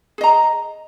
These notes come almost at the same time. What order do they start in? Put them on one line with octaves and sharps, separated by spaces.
G#4 D#5 A#5